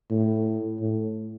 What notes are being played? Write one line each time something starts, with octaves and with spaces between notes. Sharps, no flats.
A2
A2